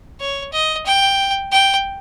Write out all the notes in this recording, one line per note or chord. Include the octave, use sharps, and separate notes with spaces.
C#5
D#5
G5
G5